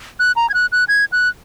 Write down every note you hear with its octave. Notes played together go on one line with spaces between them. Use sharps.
F#6
A#5
G#6
F#6
F#6
G#6
F#6